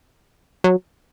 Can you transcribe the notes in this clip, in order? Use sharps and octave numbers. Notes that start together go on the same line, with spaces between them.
F#3